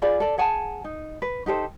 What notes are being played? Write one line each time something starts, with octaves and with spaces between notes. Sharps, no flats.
F4 G#4 D5 B5
A4 D5
G#4 F#5 G#5 A5
D#4
B4
D#4 G4 A4 C5